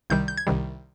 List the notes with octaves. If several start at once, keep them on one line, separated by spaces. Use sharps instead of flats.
C2 C3 D#3 G3 G6
G6
G#6
C2 C3 D#3 G3